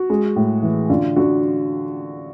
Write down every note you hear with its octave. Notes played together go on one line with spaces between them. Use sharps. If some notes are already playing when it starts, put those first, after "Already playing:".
Already playing: F#4
G#3
A2
E3
D3 F4
D3 F#4